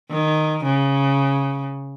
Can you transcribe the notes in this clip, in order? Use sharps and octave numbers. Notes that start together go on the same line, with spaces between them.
D#3
C#3